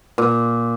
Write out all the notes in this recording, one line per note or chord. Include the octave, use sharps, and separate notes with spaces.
A#2